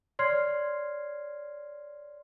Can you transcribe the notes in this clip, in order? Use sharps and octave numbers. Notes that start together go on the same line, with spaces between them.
C#5 D5 C6 F6 G#6 C7